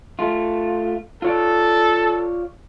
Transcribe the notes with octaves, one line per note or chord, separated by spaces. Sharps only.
A3 F4
F4 A4 C#5 D5